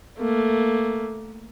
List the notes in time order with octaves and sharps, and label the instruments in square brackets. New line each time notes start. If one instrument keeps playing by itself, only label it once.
[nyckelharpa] A3 A#3